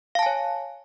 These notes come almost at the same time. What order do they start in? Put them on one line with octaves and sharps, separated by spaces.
F5 A5 G#5 C#5